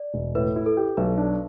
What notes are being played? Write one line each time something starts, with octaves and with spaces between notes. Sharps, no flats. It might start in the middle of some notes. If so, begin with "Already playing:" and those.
Already playing: D5
E1
A2 B4
E4
A4
G4
B1 B4
D4